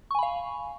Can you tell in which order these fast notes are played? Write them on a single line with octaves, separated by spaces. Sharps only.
C#6 G#5 B5 F5